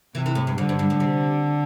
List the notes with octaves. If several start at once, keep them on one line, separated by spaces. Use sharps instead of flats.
C3 E3
E3
A2
G2
F2 D3
G2
G2
A2
C3